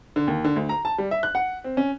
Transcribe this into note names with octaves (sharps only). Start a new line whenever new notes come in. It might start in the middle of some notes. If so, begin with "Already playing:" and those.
D3
D#2
D3
D2
A#5
A5
G3
E5
F#6
F#5
C4
C#4